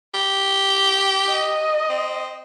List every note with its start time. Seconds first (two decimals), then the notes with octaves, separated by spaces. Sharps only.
0.14 G4
1.31 D#5
1.89 C4